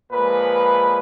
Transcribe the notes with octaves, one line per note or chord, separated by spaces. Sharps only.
A#2 F3 G#3 B4